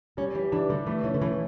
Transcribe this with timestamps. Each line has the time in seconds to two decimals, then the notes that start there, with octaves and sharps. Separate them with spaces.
0.17 G3 C#4
0.35 E3 G4
0.52 E3 D4
0.69 D3 G3
0.86 E3 A3
1.04 E3 C#4
1.14 D3
1.21 E3 A3